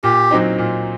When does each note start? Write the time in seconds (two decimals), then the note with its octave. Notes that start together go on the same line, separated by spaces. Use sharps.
0.04 A#2 G4
0.31 F#3 C4 D#4
0.58 A#2